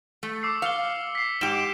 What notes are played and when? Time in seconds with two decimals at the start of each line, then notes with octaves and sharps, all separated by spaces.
0.23 A3
0.43 D6 E6 C7
0.62 F5 C#7 G7
1.15 B6 C7
1.41 G#2 G4 D7 E7 G7